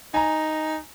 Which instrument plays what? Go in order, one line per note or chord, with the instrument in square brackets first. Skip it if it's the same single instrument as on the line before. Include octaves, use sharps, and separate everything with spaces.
[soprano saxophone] D#4 [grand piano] G#5 A#5